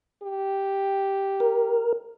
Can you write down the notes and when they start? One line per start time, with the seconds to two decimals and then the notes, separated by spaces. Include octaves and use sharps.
0.23 G4
1.40 A#4